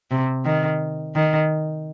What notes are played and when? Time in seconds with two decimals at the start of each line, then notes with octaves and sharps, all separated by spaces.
0.11 C3
0.45 D#3
1.15 D#3